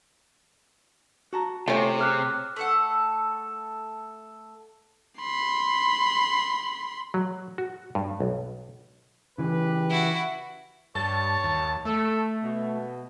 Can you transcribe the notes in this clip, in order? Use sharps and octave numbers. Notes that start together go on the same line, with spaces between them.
F#4 A5 A#5
C3 A3 C#4 F4
G#4 D6 F6 F#6
A3 A4 F#5
B5 C6
F#3
F#4
G2
B1
C#3 E3 G4 B4
E4 F#4
G2 G4 C#5 A5
D#2
A3 A4
B2